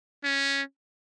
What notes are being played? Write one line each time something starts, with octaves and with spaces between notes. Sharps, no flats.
C#4